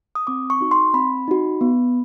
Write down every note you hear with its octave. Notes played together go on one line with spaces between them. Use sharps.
D#6
C4 D6
C#6
D#4 F#4
C6
C4 B5
D#4 F#4
B3